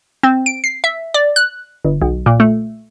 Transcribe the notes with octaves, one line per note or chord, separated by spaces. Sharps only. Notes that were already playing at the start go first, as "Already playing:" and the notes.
C4
D7
C7
E5
D5
F#6
G1
B1
A#2
A3